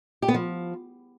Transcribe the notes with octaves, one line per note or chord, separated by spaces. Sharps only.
G4
B3
F3